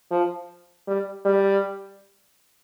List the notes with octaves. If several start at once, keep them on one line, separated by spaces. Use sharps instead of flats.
F3
G3
G3